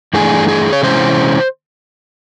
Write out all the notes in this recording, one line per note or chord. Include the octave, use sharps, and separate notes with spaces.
G2 E3 A3 D4 G#4
G#4
C#5
C3 E3 G#3 C#4 E4 C5